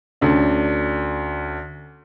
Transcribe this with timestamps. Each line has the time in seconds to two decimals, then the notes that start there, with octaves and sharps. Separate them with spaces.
0.21 D2 C#4 D4